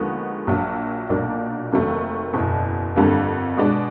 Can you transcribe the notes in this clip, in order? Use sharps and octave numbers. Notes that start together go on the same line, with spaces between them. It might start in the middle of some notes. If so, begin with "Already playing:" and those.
Already playing: D#2 D3 F3 G#3 B3
A#1 A#2 F#3
B1 A#2 F#3 A#3 D4
F1 D#2 D#3 F#3 A3
F#1 E2 B2
G1 F2 D3 G3 A#3
B2 G#3 B3 D4